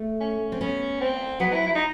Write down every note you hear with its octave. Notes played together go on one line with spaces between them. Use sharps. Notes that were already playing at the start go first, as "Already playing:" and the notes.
Already playing: A3
C#4
C4
B3 C#4
C4
F#3 B3
E4
E4
D#4